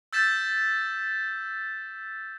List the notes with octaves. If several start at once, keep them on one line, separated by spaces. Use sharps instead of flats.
E6 G6 A6 B6 E7